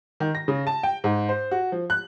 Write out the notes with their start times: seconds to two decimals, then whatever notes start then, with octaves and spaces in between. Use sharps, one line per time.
0.20 D#3
0.35 A#6
0.48 C#3
0.67 A5
0.83 G5
1.04 G#2
1.29 C5
1.51 F#4
1.72 F3
1.90 F#6